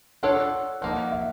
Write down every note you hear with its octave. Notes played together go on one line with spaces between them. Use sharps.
D4 F4 A4 C#5 F#5
F3 A#3 D#4 F#5
E5